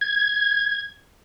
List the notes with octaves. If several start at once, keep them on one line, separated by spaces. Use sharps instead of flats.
G#6